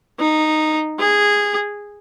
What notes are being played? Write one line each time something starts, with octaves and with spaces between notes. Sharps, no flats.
D#4
G#4